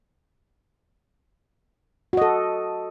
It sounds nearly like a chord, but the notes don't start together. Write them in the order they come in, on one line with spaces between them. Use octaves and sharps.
F#4 D#5 A4